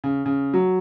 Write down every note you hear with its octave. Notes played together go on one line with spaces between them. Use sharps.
C#3
C#3
F#3